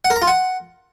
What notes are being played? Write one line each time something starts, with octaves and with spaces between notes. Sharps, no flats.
F#5
A#4
A#5
F4
F#5